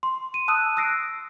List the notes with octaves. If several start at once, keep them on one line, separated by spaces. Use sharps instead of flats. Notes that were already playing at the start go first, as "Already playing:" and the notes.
C6
D#7
A5 D#6 E6 F#6 D#7
D#6 E6 F#6 A#6 C7 D7